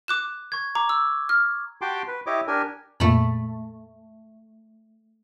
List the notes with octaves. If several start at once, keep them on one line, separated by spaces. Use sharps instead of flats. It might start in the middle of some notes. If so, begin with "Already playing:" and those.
D6 F#6 E7
C#6 G#6
A#5 D6
E6
F6
F#4 G4 G5 A5 C6 D6
B4
E4 G4 C#5 D#5 D6
D4 G4 A#4 G#5
F2 A#2 A3 A#3 B5